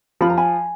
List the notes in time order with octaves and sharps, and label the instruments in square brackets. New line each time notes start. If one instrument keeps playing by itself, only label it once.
[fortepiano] F3 [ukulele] B5
[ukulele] A#5
G#5 B5